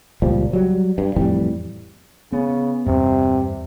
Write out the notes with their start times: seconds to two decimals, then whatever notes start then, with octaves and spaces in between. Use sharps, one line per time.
0.22 C#2 A#2 F3 G3
0.53 F#3 G3
0.98 G2
1.16 F2 A2 E3 G3
2.32 C#3 B3
2.86 E2 G2 C3